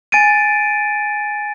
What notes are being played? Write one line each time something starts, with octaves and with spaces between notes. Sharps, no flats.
G#5 A6 D7 D#7